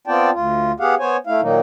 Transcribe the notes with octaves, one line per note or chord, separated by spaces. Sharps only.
B3 C4 F4 D5 G5 A5
D2 F4
B3 G4 G#4 F5 F#5
B3 C5 C#5 G#5
A3 E4 F5
A#2 D#3 F#3 A#3 D#4